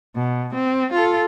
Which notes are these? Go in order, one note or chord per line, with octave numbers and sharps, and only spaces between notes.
B2
C4
F4 A4